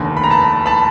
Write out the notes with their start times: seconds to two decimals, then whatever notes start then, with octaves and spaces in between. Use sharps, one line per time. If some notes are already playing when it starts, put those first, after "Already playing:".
Already playing: F1 D#2 D3
0.17 B5
0.23 A#5
0.30 A5 B5
0.66 A5 B5